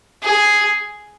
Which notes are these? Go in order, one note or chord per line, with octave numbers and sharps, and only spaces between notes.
G#4